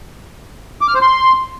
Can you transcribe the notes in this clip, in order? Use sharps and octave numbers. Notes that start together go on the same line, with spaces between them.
D6
F6
C5
C6